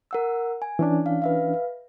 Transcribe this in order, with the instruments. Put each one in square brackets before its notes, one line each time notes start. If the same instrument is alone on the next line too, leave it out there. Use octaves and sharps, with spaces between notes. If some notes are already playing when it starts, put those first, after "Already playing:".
[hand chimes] A#4 F#5 E6
G#5
[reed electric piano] E3 C#4 D4
[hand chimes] F5
B4 E5 F5